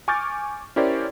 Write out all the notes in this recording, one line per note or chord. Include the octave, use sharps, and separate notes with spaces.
G#5 C#6 D6 F6 G6 A6
C#4 E4 G4 A#4 C5 D5